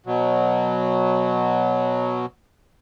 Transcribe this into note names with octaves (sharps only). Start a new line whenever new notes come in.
B2 F#3